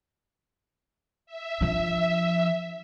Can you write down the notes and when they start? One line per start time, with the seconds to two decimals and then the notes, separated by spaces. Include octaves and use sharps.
1.26 E5
1.61 F3 D4